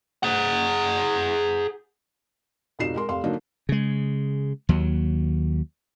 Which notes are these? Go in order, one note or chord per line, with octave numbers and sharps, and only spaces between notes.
G#4 F#5
F1 B2 D#4 F4 C7 E7
G#3 A#4 C6
F1 F5 C6
D3 F#3 A#3 D4 D#4
C#3 G#3
D#2 F#3